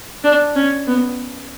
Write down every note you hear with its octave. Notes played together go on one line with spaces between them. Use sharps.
D4
C#4
B3